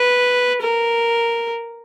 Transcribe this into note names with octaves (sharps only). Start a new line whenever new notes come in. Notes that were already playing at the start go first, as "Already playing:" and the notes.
Already playing: B4
A#4